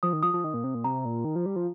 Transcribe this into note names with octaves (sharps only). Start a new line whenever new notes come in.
F3 D#6
D#3
F3 D#6
F3
D#3
A#2
C3
A#2
C3 A#5
A#2
D#3
F3
G3
F3